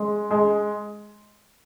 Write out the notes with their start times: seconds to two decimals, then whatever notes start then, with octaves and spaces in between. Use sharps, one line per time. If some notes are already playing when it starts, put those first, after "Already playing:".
Already playing: G#3
0.30 G#3